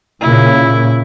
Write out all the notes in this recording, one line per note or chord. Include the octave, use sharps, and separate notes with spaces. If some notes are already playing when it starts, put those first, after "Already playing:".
A#2 C#3 E4